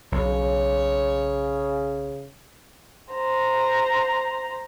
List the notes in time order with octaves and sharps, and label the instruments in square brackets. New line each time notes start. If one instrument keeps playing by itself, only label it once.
[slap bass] B1 [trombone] C#3 [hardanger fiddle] C#5
[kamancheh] C5 A#5